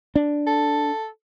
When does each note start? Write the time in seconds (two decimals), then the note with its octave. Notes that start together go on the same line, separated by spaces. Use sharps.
0.16 D4
0.47 A4